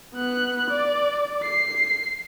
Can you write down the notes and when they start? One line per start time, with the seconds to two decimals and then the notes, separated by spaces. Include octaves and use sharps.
0.14 B3 F#6
0.70 D5
1.43 C7